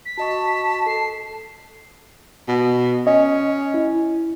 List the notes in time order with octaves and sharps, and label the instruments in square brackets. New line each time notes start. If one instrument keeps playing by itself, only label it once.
[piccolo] B6
[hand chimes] F#4 D#5 C#6 [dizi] A5
[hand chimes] A4 [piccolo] C7
[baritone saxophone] B2
[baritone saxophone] C#4 [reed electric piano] D#5
[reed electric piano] E4